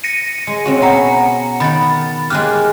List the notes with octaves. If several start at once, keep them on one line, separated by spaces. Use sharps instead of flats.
A#6 C#7 D#7
G#3
C4 C#4 F#4
B2 F#5 A#5 C#7
D#3 F#5 B5 A6
G#3 A#3 G4 F6 F#6